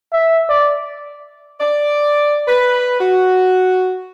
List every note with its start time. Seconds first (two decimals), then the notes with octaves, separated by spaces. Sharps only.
0.13 E5
0.49 D5
1.60 D5
2.48 B4
3.00 F#4